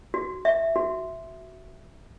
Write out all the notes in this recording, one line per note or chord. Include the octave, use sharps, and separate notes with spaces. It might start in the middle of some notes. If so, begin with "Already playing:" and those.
F#4
E5
F#4